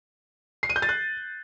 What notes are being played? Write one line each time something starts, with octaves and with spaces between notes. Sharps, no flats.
C7
D#7
G6
A6
F#6